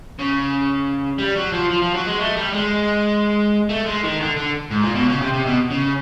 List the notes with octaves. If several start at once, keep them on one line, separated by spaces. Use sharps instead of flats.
C#3
G3
F#3
F3
F3
F3
F#3
G#3
A3
G3
G#3
A3
G#3
D#3
D3
D3
G#2
A#2
B2
C#3
C3
C3
B2
C#3